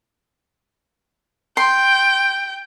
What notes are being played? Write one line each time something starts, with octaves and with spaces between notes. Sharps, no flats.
G5 C6